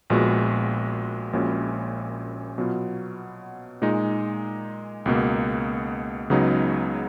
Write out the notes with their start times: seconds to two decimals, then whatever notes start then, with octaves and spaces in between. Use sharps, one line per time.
0.10 A#1 A#2 G#3 B3 F#4
1.33 A#1 A#2 G#3 C#4 F#4
2.58 B2 F#3 B3 F4
3.82 A#2 G#3 D#4
5.06 C#2 B2 A#3
6.30 C#2 C#3 F#3 B3 D#4